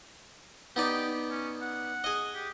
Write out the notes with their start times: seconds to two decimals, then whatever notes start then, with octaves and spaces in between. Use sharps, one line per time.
0.76 B3 D#4 G4 D5
1.30 C#4
1.62 F#5
2.04 G#4 D#5
2.35 G4